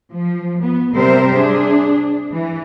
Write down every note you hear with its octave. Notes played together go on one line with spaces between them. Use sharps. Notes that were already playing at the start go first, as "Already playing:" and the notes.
F3
B3
C3 G3 C4 A#4 C5 E5
D4 G#4
E3